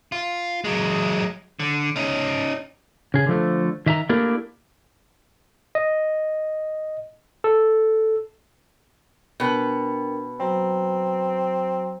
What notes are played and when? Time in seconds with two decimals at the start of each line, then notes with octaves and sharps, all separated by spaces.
0.12 F4
0.64 F#3 G#3
1.60 D3
1.96 C#4 D#4
3.14 C#3 G#4
3.27 D3 F3 A3
3.86 D#3 E5 A5 A#5
4.09 A3 A#3 D4 E4 G4 A#4
5.75 D#5
7.44 A4
9.40 B2 B3 D4 A#4 G5
10.40 F#3 C4 F#4 A#5